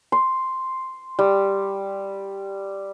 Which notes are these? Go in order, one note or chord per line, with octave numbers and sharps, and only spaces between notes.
C6
G3